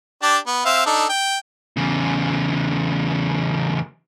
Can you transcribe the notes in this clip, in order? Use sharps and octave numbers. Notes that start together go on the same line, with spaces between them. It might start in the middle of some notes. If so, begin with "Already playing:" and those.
D4 G4 A5
B3
C4 E5 F5
D4 D#4 A4
G5
E2 C#3